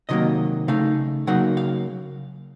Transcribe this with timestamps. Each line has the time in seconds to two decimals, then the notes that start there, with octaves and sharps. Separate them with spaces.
0.09 C3 D#3 F#3 A#3 D#5
0.68 C#3 A3 D#4 F5
1.27 C#3 F#3 A#3 D#4 F#5
1.57 F5